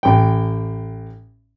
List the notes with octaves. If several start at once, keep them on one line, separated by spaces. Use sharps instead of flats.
A1 G5